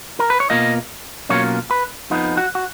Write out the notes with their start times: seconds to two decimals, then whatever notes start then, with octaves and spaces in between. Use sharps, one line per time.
0.20 A#4
0.30 B4
0.40 C#5
0.50 B2 A#3 F4 D#5
1.29 B2 F#3 A#3 C#4 F4 C#5
1.71 B4
2.10 F2 F3 B3 D#4
2.37 F#4
2.55 F#4